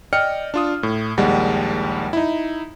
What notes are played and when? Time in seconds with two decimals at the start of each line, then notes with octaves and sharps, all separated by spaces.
0.13 D5 D#5 G5 F6 C#7
0.54 D4 F4 D#6
0.83 A2
1.17 A#1 D#2 G3 G#3 F#5
2.13 D#4 E4